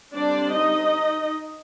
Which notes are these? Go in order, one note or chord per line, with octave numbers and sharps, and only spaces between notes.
D3 G3 C4 D4 D5
D#4 D#5